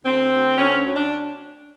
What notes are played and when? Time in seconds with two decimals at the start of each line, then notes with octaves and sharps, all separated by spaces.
0.04 D2 C4
0.32 D2
0.58 D2 C#4
0.85 D2
0.95 D4